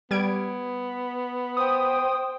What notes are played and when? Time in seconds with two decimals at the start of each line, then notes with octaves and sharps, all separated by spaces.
0.11 G3 B3 G#6 D7
1.57 C5 G5 D#6